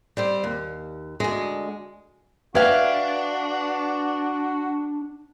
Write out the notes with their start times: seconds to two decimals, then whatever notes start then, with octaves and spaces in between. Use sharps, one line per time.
0.17 G3 C4 C5
0.44 D#2
1.20 D2 G#3
2.55 D4 F#4 B4 E5 F5 G5 G#6